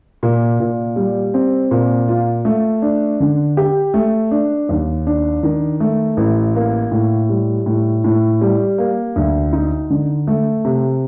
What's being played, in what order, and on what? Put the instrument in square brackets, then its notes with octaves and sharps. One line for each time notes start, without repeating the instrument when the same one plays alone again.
[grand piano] A#2
A#2
G3
C4
A#2
F4
A3
D4
D3
G4
A3
D4
D#2
D4
D#3
A3
A1
A#3
A2
G3
A2
A2
G3
A#3
D2
D#4
D3
A3
C3